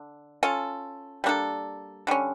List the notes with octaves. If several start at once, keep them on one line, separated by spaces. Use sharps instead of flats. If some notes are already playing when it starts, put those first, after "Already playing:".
Already playing: D3
C#4 F4 A4
G3 A#3 D4 A4
D3 G3 C#4